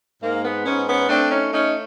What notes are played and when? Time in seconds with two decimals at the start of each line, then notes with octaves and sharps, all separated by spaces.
0.22 G#2 A#3
0.44 B3
0.65 G#2 B3 C#4
0.87 B3 C#4
1.09 A3 C4 D4
1.30 C#4 D#4
1.52 A3 C#4 D#4